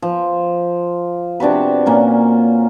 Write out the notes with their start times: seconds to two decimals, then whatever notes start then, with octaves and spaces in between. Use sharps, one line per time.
0.02 F3
1.40 C3 D4 F#4 B4
1.86 A#2 A#3 C#4